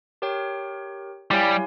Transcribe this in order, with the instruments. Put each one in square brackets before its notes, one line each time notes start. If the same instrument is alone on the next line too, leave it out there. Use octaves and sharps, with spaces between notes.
[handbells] G4 A#4 C#5 G5
[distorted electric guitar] G3 [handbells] E4 G4 C#5 F5 G#5